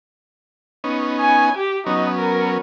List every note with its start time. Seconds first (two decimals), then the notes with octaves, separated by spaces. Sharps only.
0.84 B3 C#4 D#4
1.20 G#5
1.57 G4
1.86 F#3 B3 C#4 D#4
2.18 A#4